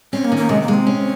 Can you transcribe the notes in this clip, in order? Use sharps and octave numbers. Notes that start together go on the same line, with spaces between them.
C4 C#4
A#3
D#3
A#3
C3 G#3
A#3
G#3
C4
C#4